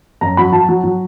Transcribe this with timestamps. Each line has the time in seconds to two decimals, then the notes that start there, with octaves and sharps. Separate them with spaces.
0.21 F#2 A#5
0.37 F#3 B5
0.53 F#3 A5
0.69 F#3
0.84 F#3